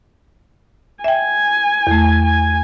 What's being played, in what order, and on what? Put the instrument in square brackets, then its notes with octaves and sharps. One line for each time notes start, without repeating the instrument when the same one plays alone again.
[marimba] E5 G5 [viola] G#5
[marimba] E2 A3
[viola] G#5